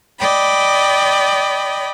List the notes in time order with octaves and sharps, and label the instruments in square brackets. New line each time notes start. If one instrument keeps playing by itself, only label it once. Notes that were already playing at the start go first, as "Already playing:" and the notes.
[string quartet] D5 D#5 G5 B5